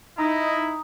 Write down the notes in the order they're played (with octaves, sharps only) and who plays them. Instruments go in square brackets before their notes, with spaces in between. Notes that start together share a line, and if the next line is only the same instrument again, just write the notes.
[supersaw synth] D#4 [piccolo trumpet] E4 [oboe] D#5 [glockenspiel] A#5 D#6